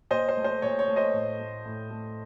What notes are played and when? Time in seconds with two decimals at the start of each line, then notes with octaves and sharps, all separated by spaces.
0.11 A#2 C5 D#5
0.28 C5
0.37 A3
0.44 C5
0.62 A#2 C#5
0.79 C#5
0.88 A3
0.96 C5 D#5
1.14 A2
1.40 A3
1.65 A2
1.90 A3